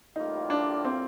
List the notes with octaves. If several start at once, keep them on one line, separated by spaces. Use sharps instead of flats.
A1 A2 G3 A#3 D#4 F4
D4
C4